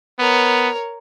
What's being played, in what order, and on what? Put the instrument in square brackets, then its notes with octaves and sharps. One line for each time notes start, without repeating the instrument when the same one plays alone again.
[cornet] B3 [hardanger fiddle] A#4 C#5